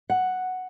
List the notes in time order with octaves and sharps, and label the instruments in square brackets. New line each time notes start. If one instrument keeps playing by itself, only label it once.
[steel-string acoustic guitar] F#5